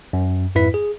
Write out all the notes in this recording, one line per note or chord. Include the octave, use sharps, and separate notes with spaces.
F#2
F2 G#2 E4 B4 B6
G#4